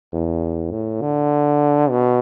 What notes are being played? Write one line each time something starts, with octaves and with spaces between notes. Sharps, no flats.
E2
A2
D3
B2